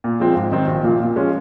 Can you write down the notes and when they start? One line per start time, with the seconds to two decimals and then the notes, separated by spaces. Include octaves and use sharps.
0.04 A#2
0.20 F3 G#3 C4 F4
0.36 G#2
0.52 D#3 F#3 C4
0.67 A#1
0.84 A#2 F3 A#3 F4
1.00 A#2
1.16 F3 G#3 C#4 F4